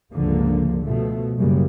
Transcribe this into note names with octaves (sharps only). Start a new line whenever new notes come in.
C#2 G2 D3 F3 A#3
B2 F3 A3
F#1 F#2 C#3 G3 A#3